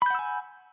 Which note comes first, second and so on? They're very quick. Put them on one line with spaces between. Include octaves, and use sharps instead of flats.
B5 G6 F#5 E6 G#5